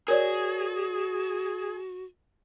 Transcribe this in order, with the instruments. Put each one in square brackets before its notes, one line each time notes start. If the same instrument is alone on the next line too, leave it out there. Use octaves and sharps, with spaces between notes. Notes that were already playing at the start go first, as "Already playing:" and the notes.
[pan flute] F#4 [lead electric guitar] G#4 [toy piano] A#4 C#5 D5